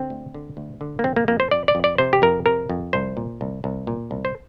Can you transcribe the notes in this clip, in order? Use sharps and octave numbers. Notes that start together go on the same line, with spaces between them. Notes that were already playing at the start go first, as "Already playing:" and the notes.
Already playing: D3 C4
D2
D3
D2
D3
A#3
F2 C4
A#3
F2 A#3
C5
F2 D5
D5
F2
D5
C3 C5
G4
F2 A#4
C3 A#4
F2
C2 C5
A#2
C2
C2
A#2
C2
C5